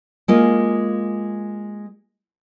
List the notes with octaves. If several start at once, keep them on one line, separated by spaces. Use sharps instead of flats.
G#3 A#3 F4